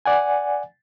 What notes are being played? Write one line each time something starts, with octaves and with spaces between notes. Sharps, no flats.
D5 F#5 G#5